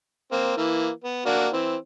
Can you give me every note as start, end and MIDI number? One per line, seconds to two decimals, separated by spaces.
0.32 0.55 58
0.32 0.55 60
0.57 0.90 52
0.57 0.90 58
1.04 1.25 59
1.26 1.47 58
1.26 1.47 62
1.26 1.47 66
1.53 1.76 52
1.53 1.76 60